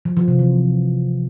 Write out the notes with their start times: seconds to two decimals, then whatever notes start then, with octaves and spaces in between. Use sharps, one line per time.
0.05 F3
0.17 F3
0.28 C3
0.39 E3